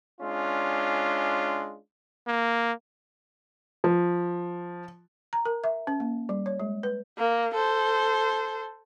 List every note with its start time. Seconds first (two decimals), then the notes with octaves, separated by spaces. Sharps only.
0.21 G#3 C#4 D4 F4
2.27 A#3
3.84 F3
5.33 A#5
5.45 A#4
5.64 E5
5.87 C#4
6.00 A#3
6.29 G3
6.46 C#5
6.60 G#3
6.83 B4
7.18 A#3
7.54 A4 C5